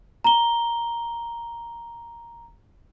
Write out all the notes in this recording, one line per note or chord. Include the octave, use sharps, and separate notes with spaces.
A#5 G7